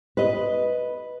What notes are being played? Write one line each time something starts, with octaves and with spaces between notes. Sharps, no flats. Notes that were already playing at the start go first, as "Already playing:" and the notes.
B4 D#5